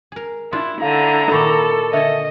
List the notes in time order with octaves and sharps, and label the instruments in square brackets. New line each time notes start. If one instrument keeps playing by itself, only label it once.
[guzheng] G#4 A#4
[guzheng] D4 F4 [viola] E4 [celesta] C6
[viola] D3 [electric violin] E4 A#5 [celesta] F5
[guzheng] A#2 D#3 [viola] A4 [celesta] B5 C#6 D6
[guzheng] D3 C#5 G#5 [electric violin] D#5 [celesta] E5